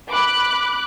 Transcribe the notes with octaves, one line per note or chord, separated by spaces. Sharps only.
B5 D6 F#6